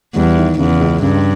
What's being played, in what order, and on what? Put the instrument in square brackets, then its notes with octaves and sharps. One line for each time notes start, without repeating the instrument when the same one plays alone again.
[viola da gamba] E2 [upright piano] G3
[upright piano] D#3
[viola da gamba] E2 [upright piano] C#3
[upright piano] C#2
[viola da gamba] G2 [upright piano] C#3